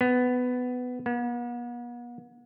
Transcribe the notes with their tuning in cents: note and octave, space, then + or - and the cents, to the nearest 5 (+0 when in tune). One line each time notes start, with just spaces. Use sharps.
B3 +15
B3 -40